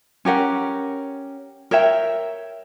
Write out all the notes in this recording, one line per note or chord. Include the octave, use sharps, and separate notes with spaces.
C#4 G4 A#4 F#5
A#4 C#5 E5 G5